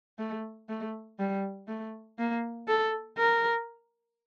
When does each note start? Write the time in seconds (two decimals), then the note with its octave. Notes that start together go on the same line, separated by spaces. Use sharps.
0.19 A3
0.69 A3
1.19 G3
1.68 A3
2.19 A#3
2.68 A4
3.18 A#4